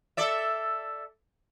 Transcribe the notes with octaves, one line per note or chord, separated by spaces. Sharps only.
A4 D5 E5